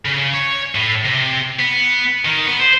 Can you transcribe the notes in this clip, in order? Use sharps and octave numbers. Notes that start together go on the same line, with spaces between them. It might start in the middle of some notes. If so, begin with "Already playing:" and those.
C#3
C#5
A2
C3
B3
D#3
B3
C5